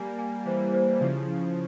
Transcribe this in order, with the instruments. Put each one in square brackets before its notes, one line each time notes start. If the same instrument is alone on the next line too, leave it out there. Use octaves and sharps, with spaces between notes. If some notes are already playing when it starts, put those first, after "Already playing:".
Already playing: [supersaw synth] G3 A#3 [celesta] G#5
[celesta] G#5
[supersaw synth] E3 G3 [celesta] C5
[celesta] C5
[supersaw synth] C#3 F3 [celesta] E4
[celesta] E4